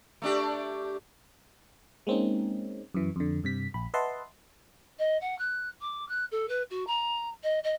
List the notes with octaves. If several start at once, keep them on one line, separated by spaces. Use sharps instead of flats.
A3 D4 G4
G#3 A#3 C4 C#4 D#4
F#2 E3
F2 D3
G2 C3 B6
A#1 B5
B4 D#5 E5 F#5 A5 C6
D#5
F#5
F#6
D6
F#6
A4
B4
F#4
A#5
D#5
D#5